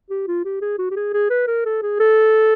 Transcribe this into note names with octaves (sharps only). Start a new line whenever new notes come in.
G4
F4
G4
G#4
F#4
G4
G#4
G#4
B4
A#4
A4
G#4
A4